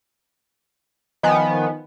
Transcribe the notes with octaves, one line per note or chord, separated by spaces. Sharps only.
D#3 F3 B3 D#5 G#5